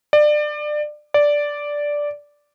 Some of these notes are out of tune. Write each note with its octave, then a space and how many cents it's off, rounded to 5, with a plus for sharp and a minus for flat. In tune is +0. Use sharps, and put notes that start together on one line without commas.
D5 +25
D5 -5